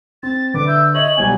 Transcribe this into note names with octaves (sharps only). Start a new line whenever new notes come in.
C4 A6
D3 B4 D6
E5 G6
C#5 D#5 E5 F#7
B2 F#3 G3 G#5